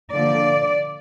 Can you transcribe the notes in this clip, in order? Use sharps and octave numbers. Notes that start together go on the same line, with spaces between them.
D3 F3 A#3 D5